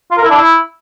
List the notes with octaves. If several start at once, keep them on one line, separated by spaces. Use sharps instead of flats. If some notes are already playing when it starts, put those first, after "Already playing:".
F4
A#4
E4
D4
E4